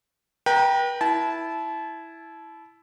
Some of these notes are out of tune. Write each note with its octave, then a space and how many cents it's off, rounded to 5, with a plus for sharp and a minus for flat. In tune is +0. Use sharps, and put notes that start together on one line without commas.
B4 -40 G5 +0 A#5 +0
E4 +0 A5 -25